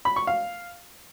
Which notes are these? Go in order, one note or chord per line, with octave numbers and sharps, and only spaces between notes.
B5
C#6
F5